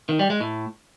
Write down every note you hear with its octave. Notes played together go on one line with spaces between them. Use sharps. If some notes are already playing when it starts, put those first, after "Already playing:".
D#3
G3
G#3
A2